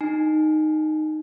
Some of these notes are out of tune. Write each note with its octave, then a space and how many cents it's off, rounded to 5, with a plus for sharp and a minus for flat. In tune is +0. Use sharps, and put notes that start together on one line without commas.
D#4 -10 G#5 +0